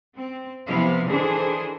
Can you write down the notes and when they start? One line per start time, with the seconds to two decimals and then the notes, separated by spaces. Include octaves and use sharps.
0.16 C4
0.67 C3 F3 B3 E4 F5
1.08 D#3 E3 D4 G#4 A4 C5